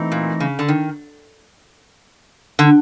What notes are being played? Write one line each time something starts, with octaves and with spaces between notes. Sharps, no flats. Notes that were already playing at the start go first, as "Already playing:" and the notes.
Already playing: E3 A3 C4 D#4
A#2
C#3
D3
D#3
D3